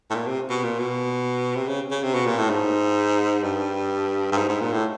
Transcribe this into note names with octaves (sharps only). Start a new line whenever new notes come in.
A2
A#2
C3
B2
A#2
B2
C3
C#3
C#3
C3
B2
A#2
A2
G#2
G2
G2
G#2
G#2
A#2
A2